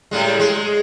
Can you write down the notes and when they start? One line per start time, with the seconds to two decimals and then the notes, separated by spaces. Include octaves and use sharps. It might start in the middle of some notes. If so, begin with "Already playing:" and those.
0.11 A2 G3 G#3
0.40 G#3